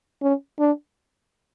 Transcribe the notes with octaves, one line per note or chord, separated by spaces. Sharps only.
C#4
D4